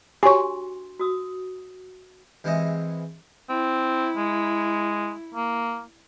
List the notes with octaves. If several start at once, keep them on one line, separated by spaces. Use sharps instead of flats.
D4 F#4 G4 C#5 G#5 C6 C#6
F#4 D#6 E6
E2 C3 E3 G#3 E4 D#5
C4 E4
G#3
A#3